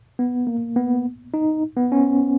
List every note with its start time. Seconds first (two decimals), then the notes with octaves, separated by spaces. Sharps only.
0.19 B3
0.47 A#3
0.76 B3
1.34 D#4
1.77 B3
1.92 C#4